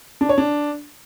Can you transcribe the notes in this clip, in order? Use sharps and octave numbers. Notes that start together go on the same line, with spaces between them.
D4
C#5
D4